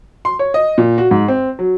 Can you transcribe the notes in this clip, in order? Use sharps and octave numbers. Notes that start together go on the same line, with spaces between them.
C6
C#5
D#5
A#2
F#4
G#2
C4
F#3